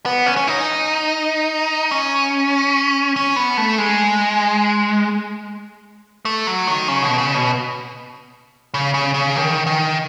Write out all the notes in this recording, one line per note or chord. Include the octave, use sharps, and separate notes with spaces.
B3
C#4
C#4
D#4
C#4
C#4
B3
A3
G#3
A3
F#3
D#3
C#3
B2
C#3
B2
C#3
C#3
C#3
D#3
D#3